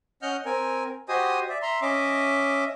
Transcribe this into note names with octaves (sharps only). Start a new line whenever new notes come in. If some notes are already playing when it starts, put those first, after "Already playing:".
C#4 D#5 F#5 F6 G6
C4 A#4 G#5
F#4 G4 C5 D#5 G#5 D#6
D5 E5
E5 A#5 C6
C#4 D#5 E5 D6